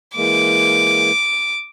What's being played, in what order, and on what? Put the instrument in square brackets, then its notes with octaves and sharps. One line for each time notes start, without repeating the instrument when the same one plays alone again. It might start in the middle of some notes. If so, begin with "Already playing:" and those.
[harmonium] E3 G#3 A#3 [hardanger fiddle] D6